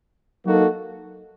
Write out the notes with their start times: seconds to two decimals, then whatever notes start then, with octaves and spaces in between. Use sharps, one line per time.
0.45 F#3 A#3 D#4 F#4 A4